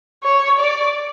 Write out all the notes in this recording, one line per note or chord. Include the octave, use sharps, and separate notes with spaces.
C#5
D5